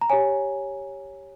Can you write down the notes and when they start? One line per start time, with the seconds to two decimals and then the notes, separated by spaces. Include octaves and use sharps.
0.01 A#5
0.10 G4 C#5 G#5